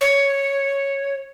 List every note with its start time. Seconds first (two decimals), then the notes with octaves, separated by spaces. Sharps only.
0.01 C#5